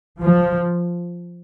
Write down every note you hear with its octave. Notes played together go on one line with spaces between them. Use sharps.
F3